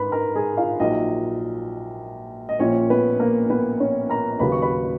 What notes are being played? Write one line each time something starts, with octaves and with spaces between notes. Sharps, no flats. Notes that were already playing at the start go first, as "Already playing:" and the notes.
Already playing: G#2 B4 B5
A#4 A#5
G#4 G#5
F4 F5
A#1 A#2 F#3 D#4 D#5
D#5
A#1 A#2 F3 C#4 C#5
B3 B4
A#3 A#4
B3 B4
C#4 C#5
A#4 A#5
D#2 C#3 F#3 B4 B5
C#6
B4 B5